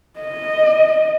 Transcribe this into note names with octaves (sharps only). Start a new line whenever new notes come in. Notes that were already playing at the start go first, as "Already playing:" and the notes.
D#5